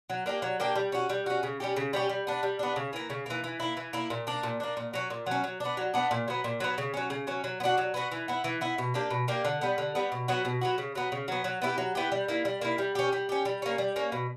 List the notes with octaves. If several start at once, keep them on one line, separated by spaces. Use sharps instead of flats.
F#3
A#3 D4 G4
F#3
A#3 D4 G4
G3
C#4 F#4
G3
C#4 F#4
C#3
G3 C#4 G4
C#3
G3 C#4 G4
G3
B3 D4
G3
B3 D4
C#3
E3 A#3
C#3
E3 A#3
E3
A#3 E4
E3
A#3 E4
A#2
A#3 D4
A#2
A#3 D4
A#2
F#3 C#4
A#2
F#3 C#4
F#3
B3 D4
F#3
B3 D4
A#2
F#3 B3
A#2
F#3 B3
C#3
F#3 C#4
C#3
F#3 C#4
F#3
B3
D4 F#4
F#3
B3 D4 F#4
E3
B3 E4
E3
B3 E4
B2
A#3 D4 G4
B2
A#3 D4 G4
D3
G3 B3
D3
G3 B3
B2
F#3 B3 F#4
B2
F#3 B3 F#4
C#3
F#3 B3
C#3
F#3 B3
F#3
B3 E4 G4
F#3
B3 E4 G4
G3
A#3 E4
G3
A#3 E4
G3
C#4 G4
G3
C#4 G4
G3
A#3 C#4
G3
A#3 C#4
B2